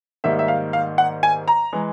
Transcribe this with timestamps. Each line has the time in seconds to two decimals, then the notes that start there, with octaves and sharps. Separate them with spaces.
0.24 G#2 D#3 G3 A#3 E5
0.39 E5
0.48 F5
0.73 F5
0.98 F#5
1.23 G#5
1.48 A#5
1.73 E3 G#3